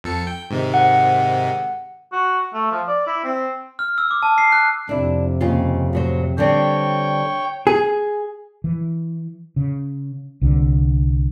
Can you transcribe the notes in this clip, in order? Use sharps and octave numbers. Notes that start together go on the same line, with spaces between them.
F2 A4 C#7
G5
G#2 C3 D#3
F#5
F#4
A3
F3
D5
E4
C4
F6
E6
D6
A5
C7
F#6
F2 C3 D4 E4
D#2 C#3 F4
A2 F#3 C5
D3 G3 C4 C#5 G5
G#4
E3
C#3
C2 D3